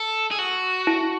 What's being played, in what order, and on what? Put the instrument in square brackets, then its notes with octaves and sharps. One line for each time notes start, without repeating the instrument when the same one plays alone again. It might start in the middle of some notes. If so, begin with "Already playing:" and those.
Already playing: [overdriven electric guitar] A4
G#4
F#4
[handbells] E4